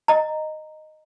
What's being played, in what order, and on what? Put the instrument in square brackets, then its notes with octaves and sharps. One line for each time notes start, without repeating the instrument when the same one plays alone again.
[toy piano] D#5 A#5